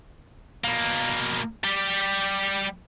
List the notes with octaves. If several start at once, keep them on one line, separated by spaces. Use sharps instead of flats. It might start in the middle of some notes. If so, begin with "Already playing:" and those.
B2 A#3
G3 G4